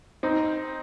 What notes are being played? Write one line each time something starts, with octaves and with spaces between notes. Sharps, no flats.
C4 D#4